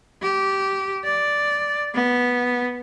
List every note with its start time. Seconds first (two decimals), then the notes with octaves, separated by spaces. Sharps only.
0.22 G4
1.05 D5
1.94 B3